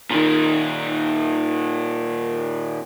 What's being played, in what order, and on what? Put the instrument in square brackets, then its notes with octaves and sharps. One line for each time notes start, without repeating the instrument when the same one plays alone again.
[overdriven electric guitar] A#2 D#3